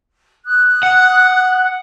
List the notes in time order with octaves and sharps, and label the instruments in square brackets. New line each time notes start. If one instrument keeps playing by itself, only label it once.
[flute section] D#6 F#6
[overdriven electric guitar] F#5